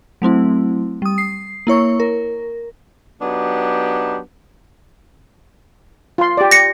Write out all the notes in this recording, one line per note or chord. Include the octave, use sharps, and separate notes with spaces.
F#3 A3 C4 E4
G3 D#6
C7
A#3 E4 C#5 C#6
A#4
F#3 B3 D4 D#4 G4
F4 C6
G4 D5
A#6 C#7